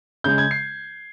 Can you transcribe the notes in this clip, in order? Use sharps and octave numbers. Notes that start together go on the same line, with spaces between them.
C#3 G#3 G6
G#6
C7